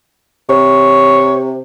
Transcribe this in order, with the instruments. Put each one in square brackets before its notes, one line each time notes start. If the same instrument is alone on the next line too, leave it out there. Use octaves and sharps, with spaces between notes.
[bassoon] C3 [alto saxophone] C#5